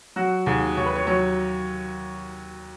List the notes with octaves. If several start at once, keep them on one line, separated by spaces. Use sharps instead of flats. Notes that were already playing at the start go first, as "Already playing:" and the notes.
F#3 F#4
D#2 G#4
D#2 C#5
B4
C#5
F#3 C#5